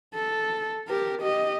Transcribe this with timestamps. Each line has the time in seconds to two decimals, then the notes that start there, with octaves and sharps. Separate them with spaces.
0.15 A4
0.88 G4 A#4
1.22 G4 D#5